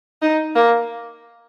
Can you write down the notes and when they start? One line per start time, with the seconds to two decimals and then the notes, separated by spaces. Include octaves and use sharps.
0.22 D#4
0.56 A#3